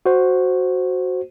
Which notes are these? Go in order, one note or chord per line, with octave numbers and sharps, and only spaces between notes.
F#4 C5